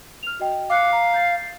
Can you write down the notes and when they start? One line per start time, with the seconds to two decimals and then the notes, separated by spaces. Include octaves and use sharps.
0.23 F6 F7
0.40 F#4 D#5 G5
0.70 F5 D6 F#6 C#7
0.93 A#5
1.14 G6 A6 C7